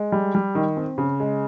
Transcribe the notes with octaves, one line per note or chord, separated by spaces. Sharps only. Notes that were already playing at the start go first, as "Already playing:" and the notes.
Already playing: G#3
G3
G3
D#3
C4
C#3
G#3